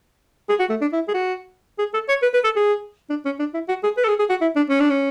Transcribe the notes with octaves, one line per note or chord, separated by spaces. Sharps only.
G#4
F#4
A3
D4
E4
G#4
F#4
G#4
A4
C#5
B4
B4
A4
G#4
D4
C#4
D4
E4
F#4
G#4
B4
A4
G#4
G#4
F#4
E4
D4
C#4
D4
C#4